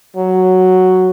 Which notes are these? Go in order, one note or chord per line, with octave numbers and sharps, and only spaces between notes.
F#3